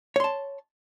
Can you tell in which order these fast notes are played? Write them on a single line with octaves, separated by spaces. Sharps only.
C#5 C6 A5